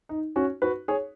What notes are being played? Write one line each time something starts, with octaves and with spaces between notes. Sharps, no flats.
D#4
C#4 F#4
F#4 B4
G#4 C#5